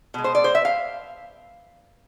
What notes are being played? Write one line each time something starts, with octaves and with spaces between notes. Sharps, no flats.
B2 G#3
C5
D5
C5
E5
F5